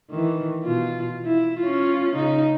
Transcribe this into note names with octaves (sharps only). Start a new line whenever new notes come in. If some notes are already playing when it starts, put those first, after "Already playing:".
D#3 E3
B2 F4
E4
C#4 F4
C#3 D#4